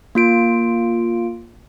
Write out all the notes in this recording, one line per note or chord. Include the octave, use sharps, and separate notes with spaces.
A#3 F4 D7